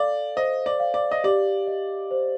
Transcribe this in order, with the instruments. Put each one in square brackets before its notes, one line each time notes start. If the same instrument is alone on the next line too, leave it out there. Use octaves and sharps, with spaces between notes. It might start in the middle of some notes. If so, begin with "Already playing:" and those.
Already playing: [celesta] A4 F5 [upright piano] D5
[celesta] C5 [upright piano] D#5
[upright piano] D5
[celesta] F5
[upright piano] D5
D#5
[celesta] G4 [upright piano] D5
[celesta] D#5
C5